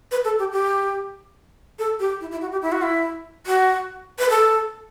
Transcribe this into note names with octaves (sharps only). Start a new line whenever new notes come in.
B4
A4
G4
G4
A4
G4
E4
E4
F#4
G4
E4
F#4
E4
F#4
B4
A4